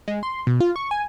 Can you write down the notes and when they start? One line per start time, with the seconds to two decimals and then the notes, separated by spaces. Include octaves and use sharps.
0.08 G#3
0.23 C6
0.47 B2
0.60 F4
0.76 C#6
0.91 G#5